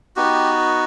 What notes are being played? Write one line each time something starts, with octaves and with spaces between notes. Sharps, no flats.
B3 D#4 F#4 G4